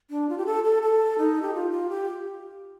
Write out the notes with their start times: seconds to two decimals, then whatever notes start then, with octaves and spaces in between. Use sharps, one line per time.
0.11 D4
0.29 F4
0.38 G4
0.46 A4
0.64 A4
0.83 A4
1.18 D#4
1.42 G4
1.54 F4
1.71 F4
1.90 G4